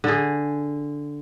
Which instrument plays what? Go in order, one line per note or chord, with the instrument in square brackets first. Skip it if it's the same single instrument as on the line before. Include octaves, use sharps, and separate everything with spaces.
[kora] D3 G#4